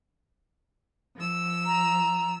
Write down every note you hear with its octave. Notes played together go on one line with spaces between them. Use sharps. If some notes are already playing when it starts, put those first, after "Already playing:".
F3 E6
A#5